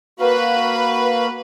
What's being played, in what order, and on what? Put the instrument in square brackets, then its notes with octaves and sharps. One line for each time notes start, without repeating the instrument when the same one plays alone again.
[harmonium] A#3 F#4 F5 [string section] B4